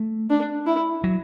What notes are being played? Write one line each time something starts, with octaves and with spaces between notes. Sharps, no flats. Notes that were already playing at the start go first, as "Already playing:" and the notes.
Already playing: A3
D4
E4
F#3